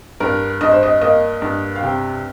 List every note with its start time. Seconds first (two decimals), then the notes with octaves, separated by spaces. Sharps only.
0.20 G2 A#4
0.61 G2 D#5
0.72 C5
0.83 D#5
1.01 A#3 D#5
1.42 G2
1.76 F5
1.83 C3 G5